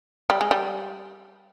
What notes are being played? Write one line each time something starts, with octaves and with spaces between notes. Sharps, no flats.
G3
G#3
G3